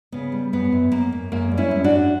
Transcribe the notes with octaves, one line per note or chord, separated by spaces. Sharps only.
C#3 B3
G3
F#2 B3
F#2
F#2 A#3
F#2
F#2 A#3
G3
C#4 E4
F#2
D4 F#4
F#2